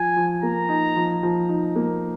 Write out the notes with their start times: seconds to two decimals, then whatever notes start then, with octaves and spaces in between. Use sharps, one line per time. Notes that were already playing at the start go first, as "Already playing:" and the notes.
Already playing: F3 F4 G#5
0.16 F3
0.43 A#3 A#5
0.69 D#4
0.96 F3
1.23 F3
1.49 D#4
1.76 A#3